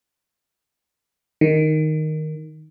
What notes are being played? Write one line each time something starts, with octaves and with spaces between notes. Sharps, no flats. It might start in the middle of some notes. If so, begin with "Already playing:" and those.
D#3